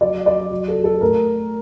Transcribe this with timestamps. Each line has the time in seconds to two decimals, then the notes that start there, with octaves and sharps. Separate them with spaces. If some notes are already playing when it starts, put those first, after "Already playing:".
0.01 F#3 D5
0.26 F#3 D5
0.51 F#3
0.68 A4
0.76 F#3
0.84 A4
1.01 A2 A#4